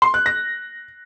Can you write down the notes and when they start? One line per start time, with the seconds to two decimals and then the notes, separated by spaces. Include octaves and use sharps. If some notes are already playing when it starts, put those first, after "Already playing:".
0.02 C6
0.14 F#6
0.26 A#6